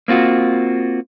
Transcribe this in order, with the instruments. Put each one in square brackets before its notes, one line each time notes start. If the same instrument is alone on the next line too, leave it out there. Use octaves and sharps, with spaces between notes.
[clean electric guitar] A#3 C4 F4 F#4